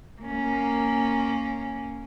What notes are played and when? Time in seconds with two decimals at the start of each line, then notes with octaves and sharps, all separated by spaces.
0.22 A#3 C#4